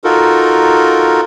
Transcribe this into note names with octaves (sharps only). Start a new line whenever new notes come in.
D#4 F4 F#4 A4 A#4